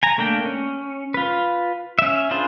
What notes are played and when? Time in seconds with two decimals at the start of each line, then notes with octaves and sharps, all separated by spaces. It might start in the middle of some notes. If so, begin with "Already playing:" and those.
0.03 G#5 A#5
0.18 A3 A#3 D4 G5
0.45 C#4
1.14 F4 B4
1.99 C#4 E5
2.31 D4 F4 G#4 B4 C5